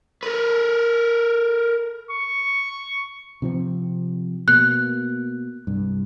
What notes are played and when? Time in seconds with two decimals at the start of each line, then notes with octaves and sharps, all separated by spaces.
0.23 A#4 B4
2.10 C#6
3.42 C3 F3 C4
4.48 B2 A#3 F#6
5.67 C2 G2